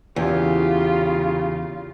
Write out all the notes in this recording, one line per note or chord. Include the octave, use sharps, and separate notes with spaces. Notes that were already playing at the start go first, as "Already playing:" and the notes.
E2 C#3 F4 G4